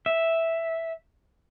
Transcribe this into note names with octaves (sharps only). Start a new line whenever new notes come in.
E5